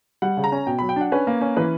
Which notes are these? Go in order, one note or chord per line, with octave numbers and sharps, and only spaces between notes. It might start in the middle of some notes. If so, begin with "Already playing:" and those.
G3 F#5
C#3
A#5
C#4
B2 G5
F#3 B5
G5
D4 F#5
C#4 B4
A#3
C#4
E3 B4